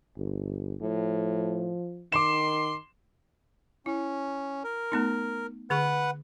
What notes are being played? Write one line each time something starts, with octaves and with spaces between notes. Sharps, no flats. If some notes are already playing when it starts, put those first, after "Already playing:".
G1
A2 F3
D#3 C6 D6 E7
C#4 E4
A#4
A3 B3 D#4
D3 G#4 B4 F#5 C#6